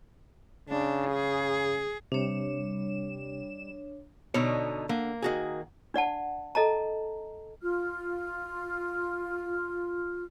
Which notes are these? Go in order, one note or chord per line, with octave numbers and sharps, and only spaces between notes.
C#3 D4
G#4
C3 G3 D4 C#5 E7
B2 D3 D#4 C#5
D3 A#3
D#3 F#4 G#4
D4 D5 F#5 A5
A4 D#5 A5 A#5
F4 F6